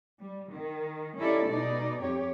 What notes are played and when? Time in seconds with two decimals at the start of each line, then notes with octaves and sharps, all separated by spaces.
0.20 G3
0.51 D#3
1.18 C#4 D#4 E4 G4 A4 D5
1.46 B2 G#3 D#4 D5
2.02 F2 G4 C#5